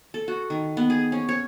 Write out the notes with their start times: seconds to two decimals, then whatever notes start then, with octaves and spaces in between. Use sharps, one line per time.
0.14 A4
0.28 F#4
0.50 D#3
0.77 B3
0.90 G#4
1.12 C#4
1.29 C#5